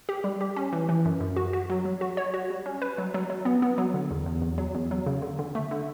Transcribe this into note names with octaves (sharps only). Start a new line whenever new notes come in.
G4
G3
G4
C#4
E3
E3
F#2
F#2
F#4
F#4
F#3
F#3
F#4
C#5
F#4
G3
C#4
B4
F#3
F#3
F#3
B3
B3
F#3
D3
E2
E2
E2
F#3
E2
F#3
C#3
D3
D3
A3
D3